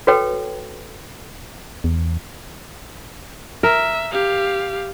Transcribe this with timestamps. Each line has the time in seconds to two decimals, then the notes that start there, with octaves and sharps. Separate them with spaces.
0.07 F#4 A4 B4 C#5 G5
1.84 E2
3.63 A#4 E5
4.12 G4 F5